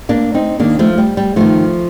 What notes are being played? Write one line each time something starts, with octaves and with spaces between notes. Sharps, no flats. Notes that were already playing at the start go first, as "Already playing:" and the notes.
A#3 D4
C4 D#4
D#2 D#3 A#3 D4
F3 A3
G3
G3
G2 D#3 F3 A3